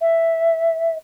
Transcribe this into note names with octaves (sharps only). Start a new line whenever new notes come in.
E5